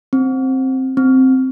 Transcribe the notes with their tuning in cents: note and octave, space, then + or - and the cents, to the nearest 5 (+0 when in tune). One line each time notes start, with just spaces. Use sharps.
C4 +10
C4 +0